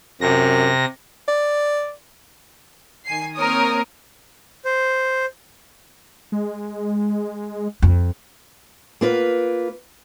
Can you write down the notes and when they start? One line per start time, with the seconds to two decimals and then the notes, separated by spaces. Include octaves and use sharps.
0.21 F#2 C3 A#6
1.28 D5
3.05 D#3 G#5 C7
3.36 A#3 C4 A#4 C#5 A#5 D#6
4.64 C5
6.32 G#3
7.82 F2
9.01 A#3 F4 B4